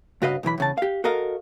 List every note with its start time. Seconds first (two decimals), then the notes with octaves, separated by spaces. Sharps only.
0.22 G2 C#3 F#4 B4 D#5 F5
0.43 B1 E2 E3 B5
0.58 E2 C#3 A5
0.78 G4 F5
1.04 F#4 A4 A#4 D#5 F5